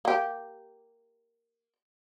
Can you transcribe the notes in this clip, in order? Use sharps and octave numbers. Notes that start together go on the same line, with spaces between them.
A#3 G4